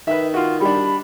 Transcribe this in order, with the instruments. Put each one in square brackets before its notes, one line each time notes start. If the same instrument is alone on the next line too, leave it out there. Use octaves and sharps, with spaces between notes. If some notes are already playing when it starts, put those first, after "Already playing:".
[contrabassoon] D#3 [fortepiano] B4 E5
[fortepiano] F4 F#4
[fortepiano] G3 D4 [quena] B5